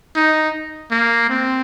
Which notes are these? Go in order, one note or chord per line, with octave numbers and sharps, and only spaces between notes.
D#4
A#3
C4